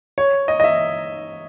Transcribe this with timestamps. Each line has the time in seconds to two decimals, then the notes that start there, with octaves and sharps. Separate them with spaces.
0.18 C#5
0.48 D#5
0.60 D#5
0.64 E5